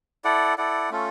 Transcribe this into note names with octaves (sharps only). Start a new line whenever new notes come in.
E4 A4 D5 F#5
E4 A4 D5 F#5
A3 C#4 F4 A4